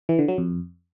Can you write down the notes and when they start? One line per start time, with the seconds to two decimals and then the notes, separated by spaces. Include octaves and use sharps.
0.09 E3
0.19 D3
0.28 F#3
0.38 F2